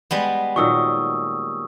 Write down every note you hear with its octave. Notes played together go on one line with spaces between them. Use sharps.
G3 G#3 B3
A#2 D#3 F#3 C#6 D#6 E6